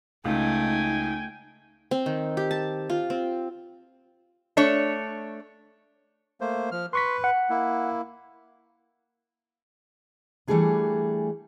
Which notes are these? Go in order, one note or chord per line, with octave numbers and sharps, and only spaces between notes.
C#2 A3 D#4 G5 G#5
C4
D#3
G4
A5
F4
C4
A3 D4 C#5
A3 A#3 C5
F3 F6
B4 C6 C#6 B6
F#5
A#3 E4
E3 G3 A3 D4 G#4 B4